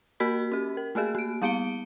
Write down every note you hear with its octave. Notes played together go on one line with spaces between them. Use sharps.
A#3 F#4 A#4 B5 B6
C#4 G4
A#4
A3 A#3 F#4 G#4
A#3 D7
G3 B3 F5 C#7 D7 G7